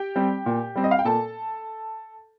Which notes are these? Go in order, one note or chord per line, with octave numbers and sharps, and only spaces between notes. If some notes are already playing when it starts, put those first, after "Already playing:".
Already playing: G4 G5
G3 C4
A#2
G3 C4
D#5
F5
G5
A#2 A4 A5